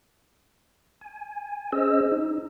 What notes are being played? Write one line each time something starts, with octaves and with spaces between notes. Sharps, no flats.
G#5
C#4 G#4 C5 D#5 E6
D#4